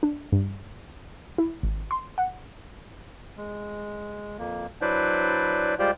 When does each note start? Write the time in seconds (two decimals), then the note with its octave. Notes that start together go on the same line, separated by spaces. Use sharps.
0.03 D4
0.32 G2
1.38 E4
1.63 G#1
1.91 C6
2.18 F#5
3.37 G#3
4.38 F2 A#3
4.81 F#3 D4 E4 B4 C5 D5
5.79 G3 G#3 F4 G4 C5 D5